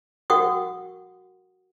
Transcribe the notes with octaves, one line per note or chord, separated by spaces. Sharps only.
F#4 A#4 F#5 G5 C#6 D#6